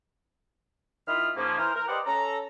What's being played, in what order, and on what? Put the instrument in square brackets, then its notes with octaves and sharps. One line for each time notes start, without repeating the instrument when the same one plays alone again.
[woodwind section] D#3 E4 F4 D#5 B5 F6
G#2 F3 A#3 C#4
E3 A#4 C5 F6
A#4
G4 B4 C5 D5 D#5 F#5
C#4 A4 A#5